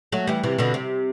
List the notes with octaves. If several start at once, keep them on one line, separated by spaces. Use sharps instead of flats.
F#3 A3
E3 G3
C3 E3
B2 D3
C3